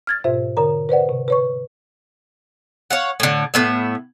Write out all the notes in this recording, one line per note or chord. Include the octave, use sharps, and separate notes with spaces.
F6 G#6 A6
G#2 B2 F4 C5 E5
D3 A#4 A#5
B4 C5 D5 F#5
C3
B4 C#5 C#6
C#5 F5 F#5
A2 D3
A2 B3 E5